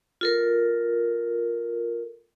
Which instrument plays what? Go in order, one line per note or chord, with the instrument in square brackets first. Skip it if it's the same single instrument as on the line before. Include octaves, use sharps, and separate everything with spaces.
[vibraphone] F4 A4 A#4